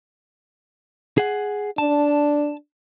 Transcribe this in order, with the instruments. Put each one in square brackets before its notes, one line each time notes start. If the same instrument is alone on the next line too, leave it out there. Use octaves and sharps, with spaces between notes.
[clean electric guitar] G#4 F#5
[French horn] D4 [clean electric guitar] A5